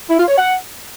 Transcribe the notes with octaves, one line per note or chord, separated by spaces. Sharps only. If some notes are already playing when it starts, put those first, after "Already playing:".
E4
F4
C#5
F#5